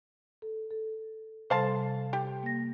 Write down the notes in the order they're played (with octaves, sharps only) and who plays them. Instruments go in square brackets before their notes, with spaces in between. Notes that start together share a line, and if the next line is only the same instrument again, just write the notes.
[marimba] A4
A4
[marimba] C3 G3 A4 [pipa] C5 F5 A5
[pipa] G4
[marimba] A#3 A#6